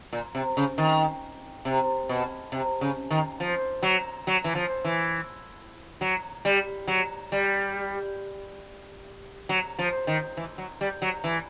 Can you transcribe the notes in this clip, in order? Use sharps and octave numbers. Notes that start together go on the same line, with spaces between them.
A#2
C3
C#3
D#3
C3
B2
C3
C#3
D#3
F3
F#3
F#3
E3
F3
E3
F#3
G3
F#3
G3
F#3
F3
D#3
E3
F#3
G3
F#3
E3